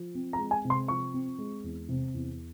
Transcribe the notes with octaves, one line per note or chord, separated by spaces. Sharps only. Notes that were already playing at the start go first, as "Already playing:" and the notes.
Already playing: F3
C4
A#5
G#3
G#5
C3
C6
F3 C#6
C4
G#3
E2
C3
E2